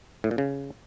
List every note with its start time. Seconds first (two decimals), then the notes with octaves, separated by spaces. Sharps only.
0.24 A2
0.31 A#2
0.38 C#3